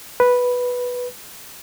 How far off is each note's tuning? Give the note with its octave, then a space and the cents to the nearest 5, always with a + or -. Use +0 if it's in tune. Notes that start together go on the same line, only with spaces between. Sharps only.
B4 -5